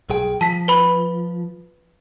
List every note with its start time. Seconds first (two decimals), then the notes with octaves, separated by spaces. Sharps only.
0.10 B1 G#4 G5
0.41 F3 A5 B6
0.68 B4 B5